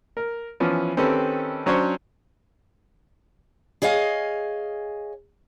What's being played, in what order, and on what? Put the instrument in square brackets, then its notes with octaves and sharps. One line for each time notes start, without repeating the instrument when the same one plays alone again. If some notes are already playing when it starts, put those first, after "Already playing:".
[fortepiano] A#4
E3 F3 B3 C#4
D#3 C4 C#4 G4 A4 B4
F#3 C#4 D4 C5 C#5
[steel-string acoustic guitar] G#4 C#5 D#5 F5 G#5